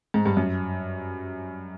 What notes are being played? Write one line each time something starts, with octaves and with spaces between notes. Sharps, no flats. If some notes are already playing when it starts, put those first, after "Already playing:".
G#2
G2
F#2